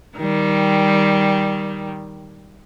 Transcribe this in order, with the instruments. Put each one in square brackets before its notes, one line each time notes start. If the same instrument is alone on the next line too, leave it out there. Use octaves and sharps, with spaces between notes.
[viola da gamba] D#3 G3